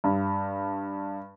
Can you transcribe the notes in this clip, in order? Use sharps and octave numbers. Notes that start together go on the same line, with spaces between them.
G2